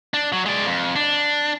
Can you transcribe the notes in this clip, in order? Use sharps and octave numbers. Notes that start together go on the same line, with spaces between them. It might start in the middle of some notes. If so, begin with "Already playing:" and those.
D4
F#3
G#3 D5
F2
D4